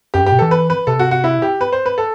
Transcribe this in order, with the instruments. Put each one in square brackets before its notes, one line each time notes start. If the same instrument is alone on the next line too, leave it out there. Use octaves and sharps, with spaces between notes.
[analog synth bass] F#2 [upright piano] G4
[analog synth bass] G2
[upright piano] G4
[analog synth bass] B2
[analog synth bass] E3 [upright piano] A4
[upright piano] B4
B4
[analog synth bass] C3 [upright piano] A4
[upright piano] F#4
F#4
E4
G4
B4
C5
B4
A4